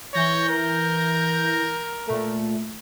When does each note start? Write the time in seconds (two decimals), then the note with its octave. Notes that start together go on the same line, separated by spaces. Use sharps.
0.14 E3 C#5 G6 A#6
0.49 A#4
2.07 A#2 A3